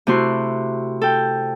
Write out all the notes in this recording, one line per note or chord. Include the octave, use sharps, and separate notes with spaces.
C3 A3 E4 F#4 C6 F#6
A4 G5